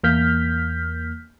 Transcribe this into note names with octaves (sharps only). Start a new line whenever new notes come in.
E2 A#3 F6 G6 B6